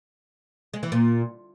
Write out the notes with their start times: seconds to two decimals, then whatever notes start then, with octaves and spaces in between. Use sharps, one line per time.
0.74 G#3
0.83 E3
0.92 A#2